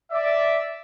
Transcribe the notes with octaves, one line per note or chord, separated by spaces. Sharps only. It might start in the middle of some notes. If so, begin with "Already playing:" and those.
D5 E5